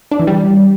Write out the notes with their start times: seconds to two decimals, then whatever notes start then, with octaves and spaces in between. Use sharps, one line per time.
0.11 D4
0.19 E3
0.27 G3